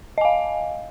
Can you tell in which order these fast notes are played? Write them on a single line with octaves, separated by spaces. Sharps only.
D#5 G#5 F5